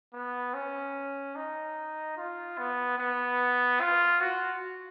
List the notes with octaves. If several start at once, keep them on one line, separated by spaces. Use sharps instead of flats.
B3
C#4
D#4
F4
B3
B3
F4
F#4